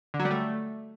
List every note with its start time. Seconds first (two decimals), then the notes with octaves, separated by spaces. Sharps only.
0.14 D3
0.20 F#3
0.25 G3
0.31 A3